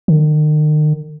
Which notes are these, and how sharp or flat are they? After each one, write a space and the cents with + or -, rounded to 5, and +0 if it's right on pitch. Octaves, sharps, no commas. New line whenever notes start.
D#3 -40